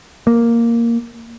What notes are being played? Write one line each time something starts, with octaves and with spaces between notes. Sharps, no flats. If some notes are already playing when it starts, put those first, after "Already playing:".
A#3